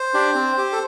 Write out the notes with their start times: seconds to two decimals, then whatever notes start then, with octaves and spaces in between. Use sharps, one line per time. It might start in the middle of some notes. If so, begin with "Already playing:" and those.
Already playing: C5
0.14 D4 G4
0.35 C4
0.58 G4
0.72 A4